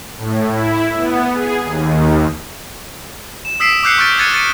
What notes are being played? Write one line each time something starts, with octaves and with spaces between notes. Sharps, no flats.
A2
E4
B3
G#4
D#2
E7
D#6 E6 B6 C7 D7 E7
D6 E6 F#6 G6 C7 C#7
C#6 F6 G6 A6 D7
F#6 G#6 A6 C#7 D#7
A6 C#7 D#7